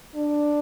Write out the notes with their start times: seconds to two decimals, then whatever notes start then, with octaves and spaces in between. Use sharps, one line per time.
0.16 D4